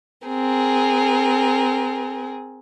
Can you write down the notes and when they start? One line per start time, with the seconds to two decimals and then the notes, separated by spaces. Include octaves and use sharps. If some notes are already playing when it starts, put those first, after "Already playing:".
0.26 C4 G#4 A#4